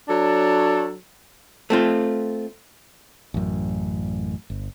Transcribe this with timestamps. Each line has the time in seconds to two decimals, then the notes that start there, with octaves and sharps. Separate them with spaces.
0.09 F#3 D4 A4 C#5
1.70 A3 C4 F4
3.34 A1 F#2
4.50 G1